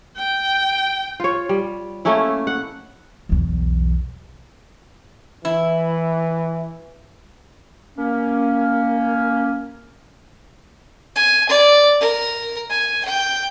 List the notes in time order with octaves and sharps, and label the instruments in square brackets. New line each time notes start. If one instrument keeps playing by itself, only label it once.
[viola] G5
[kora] F4 C#5
G3
A3 A#3 C#4 E4
F#5
[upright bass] B1 E2
[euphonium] E3 [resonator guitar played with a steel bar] E4
[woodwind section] A#3 C#4
[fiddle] G#5
D5
A#4
G#5
G5